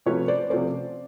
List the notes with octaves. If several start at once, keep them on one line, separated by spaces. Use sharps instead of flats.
C3 F3 A3 C#4 B4 C#5
C5 D5
C3 F3 A3 C#4 C5 D5